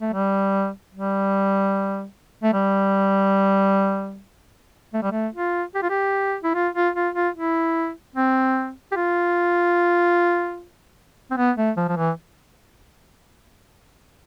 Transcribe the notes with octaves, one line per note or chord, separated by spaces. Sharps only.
A3
G3
G3
A3
G3
A3
G3
A3
F4
G4
F4
G4
E4
F4
F4
F4
F4
E4
C4
G4
F4
C4
B3
A3
F3
F3
E3